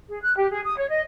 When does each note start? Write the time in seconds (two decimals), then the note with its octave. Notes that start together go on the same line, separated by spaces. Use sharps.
0.09 G#4
0.22 F#6
0.37 G4
0.51 G#4
0.64 D#6
0.77 C#5
0.89 D#5